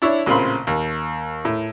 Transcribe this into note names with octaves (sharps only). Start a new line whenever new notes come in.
D4 E4 C#5
A1 A#2 C#3 C4 B5 C6
D#2
A2